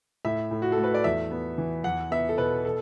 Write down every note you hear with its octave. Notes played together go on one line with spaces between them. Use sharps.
A2 E5
A2
F#4
A4
A3
B4
D5
E2 E5
B3
E3
E2 F#5
B3 E5
A4
B2 B4
A4